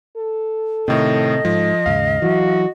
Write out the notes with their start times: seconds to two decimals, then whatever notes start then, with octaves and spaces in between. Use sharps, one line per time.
0.16 A4
0.88 A2 C3 D#3 D#5
1.45 G#2 F3
1.86 D#2 G#2 C#3 F5
2.22 E3 F#3 F#4